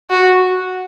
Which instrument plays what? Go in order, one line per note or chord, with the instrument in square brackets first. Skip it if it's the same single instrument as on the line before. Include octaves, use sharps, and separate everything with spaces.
[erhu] F#4